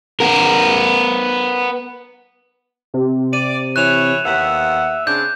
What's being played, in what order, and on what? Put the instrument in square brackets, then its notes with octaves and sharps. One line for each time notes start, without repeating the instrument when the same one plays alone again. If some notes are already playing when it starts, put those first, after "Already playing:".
[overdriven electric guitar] B3 A#4
[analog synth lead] C3
[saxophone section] D5 [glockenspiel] D#7
[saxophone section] E3 C#5 [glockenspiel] F#6 E7 F7
[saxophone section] D#2 B3 F#5 [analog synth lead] E5
[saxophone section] C#3 C4 D4 [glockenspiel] G6